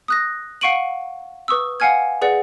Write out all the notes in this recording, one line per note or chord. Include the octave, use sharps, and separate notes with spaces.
D#6 F#6 A#6
F5 F#5 C#6 D7 D#7 F#7
B4 C#6 D#6 E6
F5 F#5 G#5 F6 G#6
G#4 B4 D5 F#5